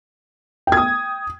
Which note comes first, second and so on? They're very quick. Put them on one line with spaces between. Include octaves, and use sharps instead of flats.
G5 G#6 D#6